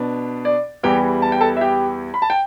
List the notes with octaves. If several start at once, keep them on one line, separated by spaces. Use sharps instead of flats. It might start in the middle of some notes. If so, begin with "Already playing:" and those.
Already playing: B2 B3 D4
D5
E2 E3 G3 G4 G5
A5
G5
A4 A5
E5
G4 G5
B5
A5
G5